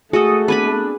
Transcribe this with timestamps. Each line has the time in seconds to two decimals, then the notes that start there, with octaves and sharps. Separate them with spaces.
0.13 A3 F#4 G#4 A4 D#6
0.48 B3 C4 D4 B4 G#5 B5